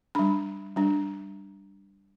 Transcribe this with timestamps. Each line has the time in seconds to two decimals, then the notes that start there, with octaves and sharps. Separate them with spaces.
0.15 G3 D4 B5
0.76 G3 D4